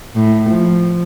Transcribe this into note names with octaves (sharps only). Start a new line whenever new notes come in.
A2
F3